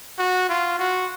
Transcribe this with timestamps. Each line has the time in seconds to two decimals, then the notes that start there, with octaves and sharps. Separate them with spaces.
0.18 F#4
0.49 F4
0.79 F#4